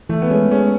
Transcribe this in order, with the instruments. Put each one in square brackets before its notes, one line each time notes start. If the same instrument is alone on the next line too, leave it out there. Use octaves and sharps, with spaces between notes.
[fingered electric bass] E3 [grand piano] A3
[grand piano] B3
[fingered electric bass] G#3 [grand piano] C#4
[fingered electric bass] G#3 [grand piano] C#4